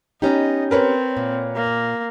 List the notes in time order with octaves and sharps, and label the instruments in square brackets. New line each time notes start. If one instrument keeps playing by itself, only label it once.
[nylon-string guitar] B3 C#4 G4 [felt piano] D#4 [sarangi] D#5
[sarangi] C4 [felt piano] A#4 B4 C#5
[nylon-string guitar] A#2
[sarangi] A#3